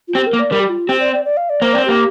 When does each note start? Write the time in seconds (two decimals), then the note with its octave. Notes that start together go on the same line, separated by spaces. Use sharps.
0.08 F4
0.15 C4 G4
0.27 A#4
0.33 A#3
0.39 D5
0.51 G3 A#4
0.60 G4
0.69 F4
0.88 C4 G4
1.00 D5
1.13 D5
1.25 D5
1.37 F5
1.50 D5
1.62 A#3 C5
1.73 C4 D5
1.85 A#3 G4